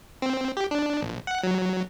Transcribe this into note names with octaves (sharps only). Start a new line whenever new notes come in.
C4
G4
D4
A#1
F#5
F#3